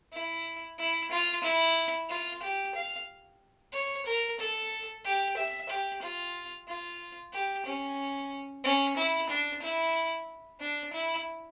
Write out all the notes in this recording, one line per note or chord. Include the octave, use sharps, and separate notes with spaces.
E4
E4
F4
E4
F4
G4
F5
C#5
A#4
A4
G4
E5
G4
F4
F4
G4
C#4
C#4
E4
D4
E4
D4
E4